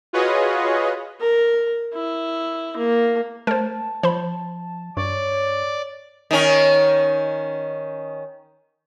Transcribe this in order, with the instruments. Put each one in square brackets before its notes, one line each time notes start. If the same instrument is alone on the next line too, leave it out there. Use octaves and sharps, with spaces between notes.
[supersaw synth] F4 F#4 G#4 B4 C#5 D#5
[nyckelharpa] A#4
E4
A#3
[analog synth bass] A3 [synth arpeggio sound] A#4 C5 [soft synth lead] A5
[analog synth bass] F3 [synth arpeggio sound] C5 B5
[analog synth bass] G2 [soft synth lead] C#5 [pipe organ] D5
[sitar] D#3 C#4